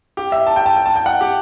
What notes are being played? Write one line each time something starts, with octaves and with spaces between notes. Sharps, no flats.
G4
E5
A5
G5
A5
G5
A5
G5
F#5
G4